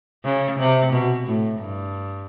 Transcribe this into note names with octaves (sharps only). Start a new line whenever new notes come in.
C#3
C3
B2
A2
G2